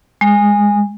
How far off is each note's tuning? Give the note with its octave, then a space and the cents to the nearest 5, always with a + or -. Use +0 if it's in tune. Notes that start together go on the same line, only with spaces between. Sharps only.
G#3 -15